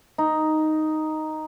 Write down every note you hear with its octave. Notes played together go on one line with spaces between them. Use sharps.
D#4